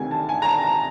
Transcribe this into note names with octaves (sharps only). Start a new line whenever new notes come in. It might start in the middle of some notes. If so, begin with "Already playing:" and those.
Already playing: D2 C3 D#3 G#5
A5
G#5
A#5
A5
A#5